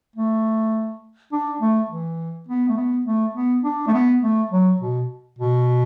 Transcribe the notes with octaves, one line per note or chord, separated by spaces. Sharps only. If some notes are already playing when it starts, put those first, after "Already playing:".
A3
D4
A3
E3
B3
A3
B3
A3
B3
D4
A3
B3
A3
F#3
B2
B2